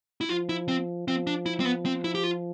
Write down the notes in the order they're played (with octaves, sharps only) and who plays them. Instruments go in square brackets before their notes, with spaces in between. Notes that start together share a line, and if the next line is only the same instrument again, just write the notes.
[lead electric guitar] E4
[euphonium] F3 [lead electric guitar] F4
[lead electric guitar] E4
C4
[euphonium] F3 [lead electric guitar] C4
[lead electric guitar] D4
E4
C4
B3
C4
E4
G4
F4